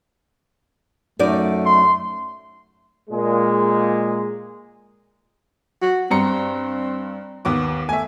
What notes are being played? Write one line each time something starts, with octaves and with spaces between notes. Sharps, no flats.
F#2 A3 D#4 D5
C6
A#2 G#3
F#4
G2 C4 A#5 C#7
D#2 B3 D6
A3 E5 G#5